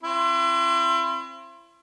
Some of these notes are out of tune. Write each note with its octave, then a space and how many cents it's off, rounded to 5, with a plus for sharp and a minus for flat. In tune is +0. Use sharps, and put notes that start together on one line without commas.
C4 +25 E4 +40